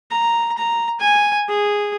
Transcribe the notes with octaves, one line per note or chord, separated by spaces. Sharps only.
A#5
A#5
G#5
G#4